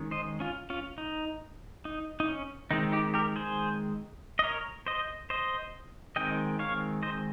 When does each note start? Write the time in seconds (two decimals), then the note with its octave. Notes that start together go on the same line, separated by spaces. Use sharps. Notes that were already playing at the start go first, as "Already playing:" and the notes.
Already playing: D#3 G#3 C#4
0.11 C5 D#5
0.40 C#4 F4
0.70 C#4 F4
0.98 D#4
1.85 D#4
2.20 D#4
2.29 C#4
2.71 D#3 G#3 C4 D#4
2.92 D#4 G4
3.14 G4 A#4
3.36 G#4 C5
4.39 D#5
4.44 A#4 C#5
4.87 C5 D#5
5.30 C5 D#5
6.16 D#3 G#3 C4 D#5 G5
6.59 C#5 F5
7.03 C5 D#5